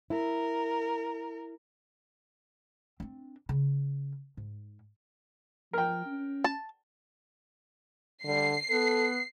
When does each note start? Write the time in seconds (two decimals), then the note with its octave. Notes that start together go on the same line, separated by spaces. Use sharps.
0.10 E4 A#4
3.00 C4 D4
3.49 C#3
4.37 G#2
5.73 F3 A#4 G5
6.06 C#4
6.44 A5
8.25 D3 G3 C7
8.70 B3 A4